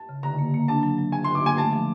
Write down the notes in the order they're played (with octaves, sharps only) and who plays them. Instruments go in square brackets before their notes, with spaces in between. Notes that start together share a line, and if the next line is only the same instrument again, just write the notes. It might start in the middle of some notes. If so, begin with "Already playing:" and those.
Already playing: [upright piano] A5
[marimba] C#3
[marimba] D3 [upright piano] A#5
[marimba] A#3
A#3
[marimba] D4 [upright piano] A5
[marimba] F#3
F#3
[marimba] F#3 [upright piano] G#5
[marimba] D3 [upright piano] C6
[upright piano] D6
[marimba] A#3 [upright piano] G#5
[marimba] A3 [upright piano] A5
[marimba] F3